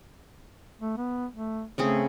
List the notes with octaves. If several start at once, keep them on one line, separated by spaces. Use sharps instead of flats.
A3
B3
A3
C#3 A3 C4 G#4